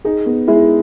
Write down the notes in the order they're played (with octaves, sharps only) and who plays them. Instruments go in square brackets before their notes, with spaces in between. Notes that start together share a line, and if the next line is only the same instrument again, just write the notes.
[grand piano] D#4 [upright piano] G#4
[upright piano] B3
[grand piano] G#3 G#4 [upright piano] E4